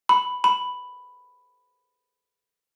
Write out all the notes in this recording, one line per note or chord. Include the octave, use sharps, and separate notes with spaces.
B5
B5